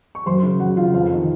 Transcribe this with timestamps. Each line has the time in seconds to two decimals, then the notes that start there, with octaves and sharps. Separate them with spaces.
0.15 C#6
0.26 F#2 C5 C6
0.43 C#3
0.59 F#2 F#4 F#5
0.76 C#3 F4 F5
0.94 F2 F4 F5
1.11 C3 D#3